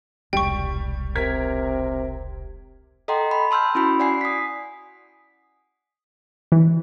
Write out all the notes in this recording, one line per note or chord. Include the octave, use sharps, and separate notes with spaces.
E1 C2 G3 G5 C#6
C3 A#4 G#6 B6
A4 D#5 F#5 G5 A#5 C6
B5
A5 C6 E6 F6 G6
C#4 E4 F#4 B5
D5 F#5 G#5 C7
D#6 B6
E3